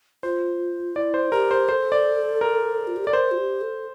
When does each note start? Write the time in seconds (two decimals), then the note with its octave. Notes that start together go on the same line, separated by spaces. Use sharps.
0.23 F4 C5
0.95 E4 D5
1.14 C5
1.31 G4 A#4
1.51 C5
1.68 A4 C5
1.92 D5
2.41 A#4
2.87 F4
2.96 G4
3.05 A4 D5
3.13 A#4 C5
3.31 F4
3.37 G4
3.61 A4